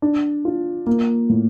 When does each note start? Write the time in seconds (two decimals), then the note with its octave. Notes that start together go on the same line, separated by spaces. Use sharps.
0.02 D4
0.45 F4
0.87 A#3
1.29 A2